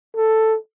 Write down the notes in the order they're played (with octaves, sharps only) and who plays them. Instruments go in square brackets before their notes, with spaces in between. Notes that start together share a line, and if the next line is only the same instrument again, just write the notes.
[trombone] A4